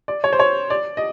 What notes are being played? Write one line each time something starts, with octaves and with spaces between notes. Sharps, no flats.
D5
C#5
C5
C#5
D5
D#5